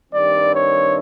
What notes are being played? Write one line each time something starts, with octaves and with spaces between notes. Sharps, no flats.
G2 D#3 G3 C4 D5
C#5